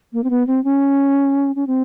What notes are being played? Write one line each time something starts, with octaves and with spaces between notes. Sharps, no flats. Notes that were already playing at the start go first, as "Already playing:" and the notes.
A#3
C4
B3
C4
C#4
C#4
C4